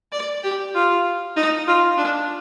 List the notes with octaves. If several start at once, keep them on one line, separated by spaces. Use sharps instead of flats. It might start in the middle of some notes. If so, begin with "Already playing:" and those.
D5
G4
F4
D#4
F4
D4